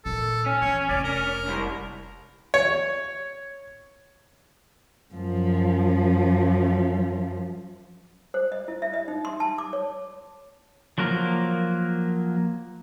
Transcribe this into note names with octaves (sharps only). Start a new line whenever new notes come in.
A#2 D#3 A4
C#4
E3 C#5
F1 D5
A#4
C2
C#5
F#2 F3
C5
D#5
E4
E5
D#5
D#4
C6
A5
D6
C#5
F3 F#3 A#3 A#4